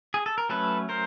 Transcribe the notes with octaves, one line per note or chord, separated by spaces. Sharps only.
G#4
A4
A#4
F#3 A3 C#4 A4 B4
A#4 C5